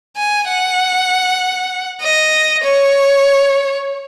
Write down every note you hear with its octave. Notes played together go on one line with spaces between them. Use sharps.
G#5
F#5
D#5
C#5